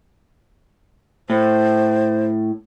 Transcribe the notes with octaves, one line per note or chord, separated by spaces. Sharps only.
A2 C5